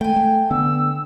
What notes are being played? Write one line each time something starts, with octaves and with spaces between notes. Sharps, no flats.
A3 G5 G#5
A3
D3 B3 E6